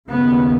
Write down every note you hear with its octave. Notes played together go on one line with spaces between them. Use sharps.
D#2 C#3 B3